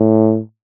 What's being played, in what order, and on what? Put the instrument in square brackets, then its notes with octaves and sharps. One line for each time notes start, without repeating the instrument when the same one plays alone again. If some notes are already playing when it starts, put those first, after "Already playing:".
Already playing: [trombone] A2